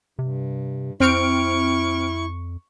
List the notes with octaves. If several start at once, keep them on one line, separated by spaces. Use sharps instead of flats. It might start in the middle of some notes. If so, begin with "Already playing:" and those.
G2 C3
F2 C4 E4 C#6 F6 D7